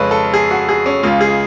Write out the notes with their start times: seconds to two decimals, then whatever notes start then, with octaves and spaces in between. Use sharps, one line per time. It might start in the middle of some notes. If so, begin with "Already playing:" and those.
Already playing: F2 C#3 G#3 B4 C#5
0.11 A4
0.34 G#4
0.51 F#4
0.69 G#4
0.86 C#4
1.03 C#2 C#3 G#3 F4
1.21 G#4